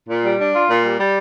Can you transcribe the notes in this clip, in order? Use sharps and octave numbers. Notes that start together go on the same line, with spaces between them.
A#2
G3
D4
F4
A#2
G3
G3